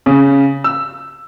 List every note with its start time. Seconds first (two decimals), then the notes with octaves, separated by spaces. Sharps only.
0.06 C#3
0.64 E6